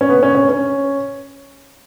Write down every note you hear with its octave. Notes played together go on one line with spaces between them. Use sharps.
C#4
B3
C#4
C#4
C#4